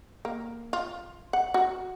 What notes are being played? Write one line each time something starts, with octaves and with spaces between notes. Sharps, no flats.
A#3
F4
F#5
F#4